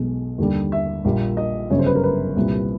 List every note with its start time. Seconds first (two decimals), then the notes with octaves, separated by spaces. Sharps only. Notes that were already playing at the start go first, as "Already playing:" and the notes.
Already playing: B1 B2 G#3
0.38 D#2 D3 G3
0.72 E5
1.04 A#1 A#2 G3 A#3
1.37 D#5
1.70 G1 F#2 C#3 C#5
1.79 C5
1.86 B4
1.95 A#4
2.03 B4
2.36 C2 A#2 G3